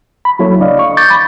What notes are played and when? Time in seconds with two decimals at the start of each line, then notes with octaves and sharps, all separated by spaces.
0.25 B5
0.39 F#3 A#3 E4 A4 C#5
0.59 C#2 D4 D5 D#5 F5
0.79 C#6
0.97 C#6 D6 G6 A6
1.10 B5